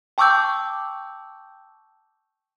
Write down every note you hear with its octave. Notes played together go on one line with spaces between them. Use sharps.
G5 A5 C#6 D6 E6 G6